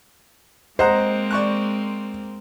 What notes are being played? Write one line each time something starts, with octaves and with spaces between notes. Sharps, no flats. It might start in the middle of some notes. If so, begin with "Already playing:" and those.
G#3 A#3 C4 C5 D#5 F#5 A#5
D5 C#6 F#6